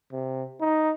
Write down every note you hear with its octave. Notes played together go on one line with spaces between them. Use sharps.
C3
D#4